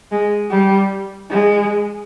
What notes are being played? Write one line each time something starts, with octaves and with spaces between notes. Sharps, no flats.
G#3
G3
G#3